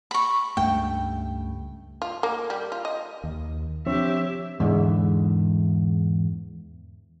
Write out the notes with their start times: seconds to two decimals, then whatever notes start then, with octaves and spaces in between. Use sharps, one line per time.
0.11 B5 C#6
0.57 C#2 G2 A3 G5
2.02 F4
2.23 A#3
2.50 G3
2.72 F4
2.85 D#5
3.24 D#2
3.86 F3 C4 D4 G4 C#5 E5
4.60 E2 G#2 D3